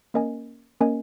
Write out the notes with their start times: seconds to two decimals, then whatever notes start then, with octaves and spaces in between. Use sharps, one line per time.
0.14 A#3 C#4 A#4 D#5 G#5
0.80 A#3 C#4 A#4 D#5 G#5